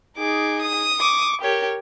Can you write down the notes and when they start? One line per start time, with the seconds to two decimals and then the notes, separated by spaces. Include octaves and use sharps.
0.17 D#4 G#4 D6
0.61 D#6
0.99 C#6 D6
1.41 G4 A#4 C#5